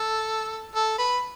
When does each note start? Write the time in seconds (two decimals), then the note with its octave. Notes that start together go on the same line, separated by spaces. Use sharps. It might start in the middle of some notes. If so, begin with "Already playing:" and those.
Already playing: A4
0.75 A4
0.98 B4